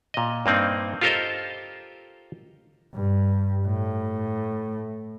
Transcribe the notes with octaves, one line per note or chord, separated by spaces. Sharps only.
A#2 D#5
G2 A#3 C4 D#4
F4 G4 A4 A#4 C5 D#5
G2
A2